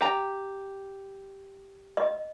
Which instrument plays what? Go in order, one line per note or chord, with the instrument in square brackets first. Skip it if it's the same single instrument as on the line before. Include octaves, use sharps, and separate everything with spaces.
[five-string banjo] G4 A#5
[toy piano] D#5